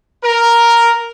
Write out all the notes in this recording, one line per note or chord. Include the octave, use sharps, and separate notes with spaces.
A#4